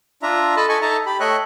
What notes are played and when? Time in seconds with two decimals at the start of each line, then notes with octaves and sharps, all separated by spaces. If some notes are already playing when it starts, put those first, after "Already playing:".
0.23 D4 F4 E5 A#5
0.57 A4 D#5 A5 B5
0.69 A4 D#5 G#5 C#6
0.82 D#4 A4 D#5 E5 A5 A#5
1.06 G4 B5
1.20 A3 C#5 D#5 E5 G5 F#6